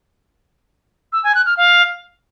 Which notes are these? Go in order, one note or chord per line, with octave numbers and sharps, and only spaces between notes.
E6
G#5
F#6
F6
F5